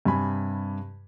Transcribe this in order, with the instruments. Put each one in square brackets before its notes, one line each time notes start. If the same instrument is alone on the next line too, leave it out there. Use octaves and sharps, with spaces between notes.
[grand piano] G2 C3 G#5 B5